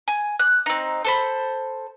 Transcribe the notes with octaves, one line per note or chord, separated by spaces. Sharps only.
G#5
F#6
C4 D#4
A4 C5 B5